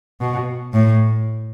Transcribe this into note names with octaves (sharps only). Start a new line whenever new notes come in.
B2
A2